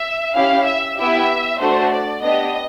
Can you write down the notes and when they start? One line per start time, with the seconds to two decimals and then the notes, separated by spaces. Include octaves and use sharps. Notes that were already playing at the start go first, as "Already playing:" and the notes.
Already playing: E5
0.34 C#4 E4 G4 F5
0.66 E5
0.97 B3 E4 G4 E5
1.60 A3 D4 F#4 A4 C5
1.92 D5
2.23 B3 D4 G4 D#5